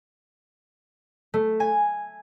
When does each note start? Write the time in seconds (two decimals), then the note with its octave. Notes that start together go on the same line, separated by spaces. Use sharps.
1.34 A3
1.60 G#5